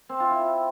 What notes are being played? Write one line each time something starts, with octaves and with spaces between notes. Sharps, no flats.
C4
F4
E4